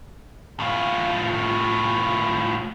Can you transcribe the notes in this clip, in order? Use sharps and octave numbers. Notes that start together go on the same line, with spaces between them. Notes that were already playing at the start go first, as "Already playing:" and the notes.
A2 F4